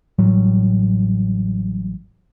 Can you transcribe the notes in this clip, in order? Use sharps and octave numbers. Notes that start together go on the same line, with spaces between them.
A1 A2 F#3 G3